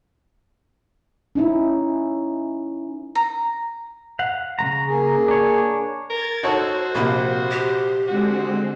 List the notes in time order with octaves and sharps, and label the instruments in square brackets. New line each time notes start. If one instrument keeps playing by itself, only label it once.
[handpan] C#4 D#4 E4
[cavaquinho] A#5
[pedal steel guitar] F5 F#5
C#3 A3 A#5
[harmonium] A#3 G#4
[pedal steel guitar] D4 C#5
[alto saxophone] A#4 [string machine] G#6 A6
[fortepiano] D#4 C#5 A5 [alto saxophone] F#4 [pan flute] A4 [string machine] C5
[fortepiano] A#1 C3 [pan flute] A#3
[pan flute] G4
[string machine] D3 G#3 C4 [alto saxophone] F#4